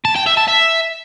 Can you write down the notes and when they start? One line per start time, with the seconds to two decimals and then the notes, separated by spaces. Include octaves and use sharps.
0.05 A5
0.16 G5
0.26 E5
0.37 A5
0.48 E5